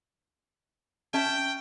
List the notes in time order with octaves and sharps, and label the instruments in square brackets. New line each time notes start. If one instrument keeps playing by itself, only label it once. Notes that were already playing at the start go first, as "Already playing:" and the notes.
[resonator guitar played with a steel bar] C#4 E5 A5 [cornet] G5